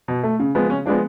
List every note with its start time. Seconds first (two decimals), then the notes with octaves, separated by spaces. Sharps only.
0.08 B2
0.23 A3
0.39 C#3
0.55 F3 G#3 B3
0.70 C#3 C#4
0.86 F3 G#3 B3 D4